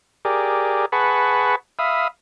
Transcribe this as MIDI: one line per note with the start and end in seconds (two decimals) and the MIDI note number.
0.25 0.86 67
0.25 0.86 68
0.25 0.86 70
0.25 0.86 74
0.92 1.55 68
0.92 1.55 71
0.92 1.55 78
0.92 1.55 81
0.92 1.55 83
0.92 1.55 85
1.79 2.08 76
1.79 2.08 77
1.79 2.08 83
1.79 2.08 87